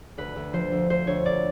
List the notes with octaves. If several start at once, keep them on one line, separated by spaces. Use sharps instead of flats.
D2 B4
D2
F3 C5
D2
D2 C5
D2 C#5
D2 D5